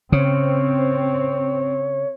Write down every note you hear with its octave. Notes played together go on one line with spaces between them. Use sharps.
C#3 C4 C#5